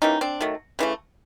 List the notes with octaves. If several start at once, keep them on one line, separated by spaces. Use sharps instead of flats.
E3 G3 A#3 C#4 D#4
C4 D4
D#3 F#3 A3
C#3 E3 A3